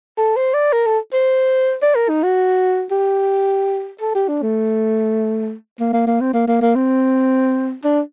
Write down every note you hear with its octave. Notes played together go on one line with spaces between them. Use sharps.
A4
C5
D5
A#4
A4
C5
D5
A#4
D#4
F#4
G4
A4
G4
D4
A3
A#3
A#3
A#3
C4
A#3
A#3
A#3
C4
D4